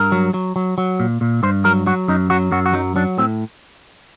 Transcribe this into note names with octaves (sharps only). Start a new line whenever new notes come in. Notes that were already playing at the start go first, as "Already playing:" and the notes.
Already playing: G2 A#4
F#3
F#3
F#3
F#3
A#2
A#2
G2 C5
F#3 A#4
F#3 F#4
F#2 D#4
F#3 F#4
F#2 F#4
F#4
F#3 D#4
F#3 D4
A2 C4